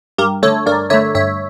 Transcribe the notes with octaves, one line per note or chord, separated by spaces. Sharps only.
G2 G4 A#4
D3 A3 A4 C#5
G2 A#4 D5
D3 A3 C#5 E5
G2 C#5 E5